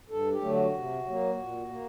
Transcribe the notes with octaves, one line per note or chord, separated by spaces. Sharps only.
G2 A4
G4
D3 F#3 A3
F#4
C3
F#3 A#3
A#2
A#3